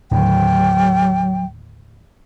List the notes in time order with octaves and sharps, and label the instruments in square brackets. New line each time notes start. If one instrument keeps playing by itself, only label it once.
[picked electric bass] D#2 A2 D3 [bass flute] F#3 [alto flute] G5